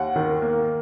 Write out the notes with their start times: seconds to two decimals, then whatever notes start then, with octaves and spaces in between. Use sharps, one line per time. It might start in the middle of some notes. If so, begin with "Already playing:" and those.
Already playing: D#2 F#5
0.16 D#3
0.42 A#3